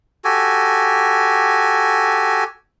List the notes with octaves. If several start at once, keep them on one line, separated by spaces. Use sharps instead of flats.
F#4 G4 A4 G#5